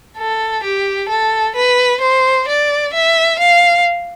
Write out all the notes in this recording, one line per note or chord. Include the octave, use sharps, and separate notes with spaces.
A4
G4
A4
B4
C5
D5
E5
F5